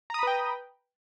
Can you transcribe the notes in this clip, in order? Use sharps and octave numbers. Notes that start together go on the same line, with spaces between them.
B4 G5 A#5 B5 D#6